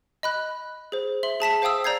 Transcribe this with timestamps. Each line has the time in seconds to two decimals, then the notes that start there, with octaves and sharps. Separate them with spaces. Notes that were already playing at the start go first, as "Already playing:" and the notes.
0.23 D#5 B5 F#6
0.92 G#4 C5
1.23 E5 C6 F#7
1.40 G#4 A5 B6 E7
1.62 C5 F5 G5 D#6 E6
1.84 D5 A#5 G6 G#6 C7